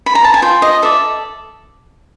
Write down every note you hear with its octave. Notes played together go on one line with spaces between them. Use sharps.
B5
A#5
A5
G#5
F4 G5
D#5
A4 D5 E5